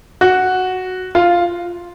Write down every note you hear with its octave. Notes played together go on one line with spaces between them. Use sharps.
F#4
F4